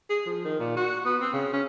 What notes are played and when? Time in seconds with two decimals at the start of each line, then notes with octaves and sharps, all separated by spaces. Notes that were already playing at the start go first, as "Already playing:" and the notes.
0.10 G#4
0.26 F3
0.44 D#3
0.59 A#2
0.76 F#4
1.05 B3
1.21 C4
1.33 C#3
1.53 C#4